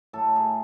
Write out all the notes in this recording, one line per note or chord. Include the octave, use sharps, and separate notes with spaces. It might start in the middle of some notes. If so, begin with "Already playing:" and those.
A2 F#3 A4
G#4